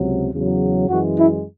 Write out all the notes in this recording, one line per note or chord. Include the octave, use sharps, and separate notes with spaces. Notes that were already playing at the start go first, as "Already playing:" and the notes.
Already playing: C#2 C3 F#3
E2 C#3 F#3
F#2 E3 G#3 F#4
E4